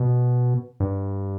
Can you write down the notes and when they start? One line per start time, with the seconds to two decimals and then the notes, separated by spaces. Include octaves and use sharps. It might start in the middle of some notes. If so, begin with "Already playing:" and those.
Already playing: B2
0.80 G2